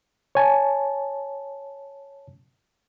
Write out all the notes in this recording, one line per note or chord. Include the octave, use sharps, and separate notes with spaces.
C#5 G#5 A5